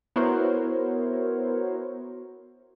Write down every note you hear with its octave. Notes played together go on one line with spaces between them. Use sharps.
B3 E4 F#4 A#4 C5 C#5